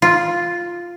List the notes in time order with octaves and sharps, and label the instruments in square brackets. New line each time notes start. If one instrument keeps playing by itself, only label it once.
[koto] F4